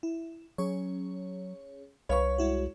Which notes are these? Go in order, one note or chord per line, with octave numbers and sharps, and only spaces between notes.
E4
F#3 C#4 G#4 C#5
C2 B4 C#5 F5 B5 C#6
G#3 E4 F#4